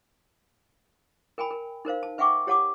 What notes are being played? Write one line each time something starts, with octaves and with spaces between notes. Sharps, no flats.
A#4 G5 G#5 B5
A#4
D#4 A#4 C5 F5
A5
B4 E5 F#5 G5 C#6 D6
G4 C#5 F#5 A5 D6 D#6